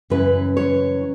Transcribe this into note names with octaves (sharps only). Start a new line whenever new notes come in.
F#2 C#3 E3 B4
C#5